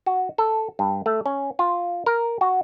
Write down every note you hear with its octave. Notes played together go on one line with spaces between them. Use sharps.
F#4
A4
G2
A3
C#4
F4
A#4
F#4